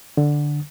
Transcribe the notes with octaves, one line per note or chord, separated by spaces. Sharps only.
D3